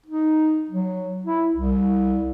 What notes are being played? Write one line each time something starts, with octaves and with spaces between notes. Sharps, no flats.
D#4
F#3
E4
C2